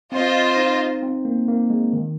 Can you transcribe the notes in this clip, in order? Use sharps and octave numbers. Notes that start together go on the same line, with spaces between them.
C4 F4 C5 D#5
D#4
C4
A#3
A#3
G#3
D#3